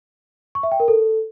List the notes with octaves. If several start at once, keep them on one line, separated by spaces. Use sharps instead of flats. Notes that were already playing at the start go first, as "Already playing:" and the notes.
C#6
E5
G5
A#4
A4